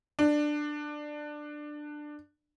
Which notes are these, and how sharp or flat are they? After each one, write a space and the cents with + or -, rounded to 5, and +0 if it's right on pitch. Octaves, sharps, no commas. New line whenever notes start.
D4 +15